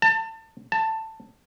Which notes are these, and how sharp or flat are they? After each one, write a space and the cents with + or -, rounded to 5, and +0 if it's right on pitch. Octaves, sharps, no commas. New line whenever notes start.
A5 +30
A5 +15